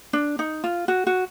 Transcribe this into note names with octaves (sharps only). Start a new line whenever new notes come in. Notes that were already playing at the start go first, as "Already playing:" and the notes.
D4
D#4
F4
F#4
F#4